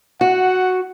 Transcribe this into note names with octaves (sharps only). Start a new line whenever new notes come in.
F#4 F#5